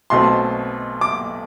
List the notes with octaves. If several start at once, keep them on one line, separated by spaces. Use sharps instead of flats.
B1 B2 A3 C4 C6
D6